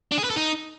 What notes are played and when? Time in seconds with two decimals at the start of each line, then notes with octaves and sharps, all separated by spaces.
0.12 D4
0.18 G#4
0.24 B4
0.30 A4
0.36 D#4